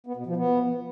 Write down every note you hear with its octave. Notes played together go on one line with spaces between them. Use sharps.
B3
B2
F3
B3